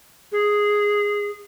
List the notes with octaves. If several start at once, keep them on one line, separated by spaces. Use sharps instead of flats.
G#4